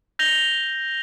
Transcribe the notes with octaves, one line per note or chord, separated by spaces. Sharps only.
G6 A#6 F7 G7